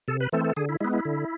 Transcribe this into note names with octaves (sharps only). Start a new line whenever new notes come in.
C3 A4
B4
E3 A3 C4 A4
A4
D3 G#4
E4
G#3 B3 E4
E4
D3